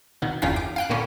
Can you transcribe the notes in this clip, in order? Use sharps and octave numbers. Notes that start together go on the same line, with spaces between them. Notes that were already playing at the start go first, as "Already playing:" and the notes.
B2 D#3 B3
G1 E2 D#3 C#4 F4 B6
D6
F5 G5 F#6
A#2 D3 A#3 B3 C#4